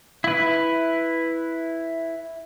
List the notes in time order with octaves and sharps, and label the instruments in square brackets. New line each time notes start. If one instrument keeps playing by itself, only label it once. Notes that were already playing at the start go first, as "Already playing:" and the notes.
[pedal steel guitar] E4 B4